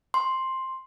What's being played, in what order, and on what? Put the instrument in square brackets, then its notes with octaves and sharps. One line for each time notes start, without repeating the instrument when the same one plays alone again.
[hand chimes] C6